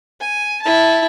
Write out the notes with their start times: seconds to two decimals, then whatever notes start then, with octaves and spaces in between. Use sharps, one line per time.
0.21 G#5
0.62 E4 A5